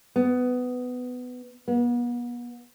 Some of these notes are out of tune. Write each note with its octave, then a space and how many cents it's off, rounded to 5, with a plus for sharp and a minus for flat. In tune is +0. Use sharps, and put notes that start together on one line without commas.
B3 +15
B3 -40